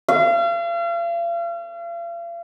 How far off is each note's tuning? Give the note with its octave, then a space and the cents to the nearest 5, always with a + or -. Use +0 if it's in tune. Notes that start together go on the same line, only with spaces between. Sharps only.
F5 -40